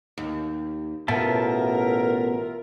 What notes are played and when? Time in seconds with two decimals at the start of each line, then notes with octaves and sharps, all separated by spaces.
0.18 D#2
1.08 A1 B2 F4 A#4 E5 A5